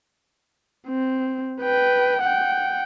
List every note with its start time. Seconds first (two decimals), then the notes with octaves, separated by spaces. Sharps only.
0.88 C4
1.62 B4 G5
2.22 F#5 G5